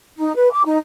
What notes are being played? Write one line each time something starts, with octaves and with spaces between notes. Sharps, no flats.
D#4
B4
D6
D#4